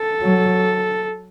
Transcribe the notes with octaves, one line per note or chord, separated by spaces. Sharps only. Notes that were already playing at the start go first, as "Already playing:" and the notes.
Already playing: A4
F#3